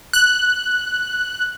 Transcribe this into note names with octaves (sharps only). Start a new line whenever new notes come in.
F#6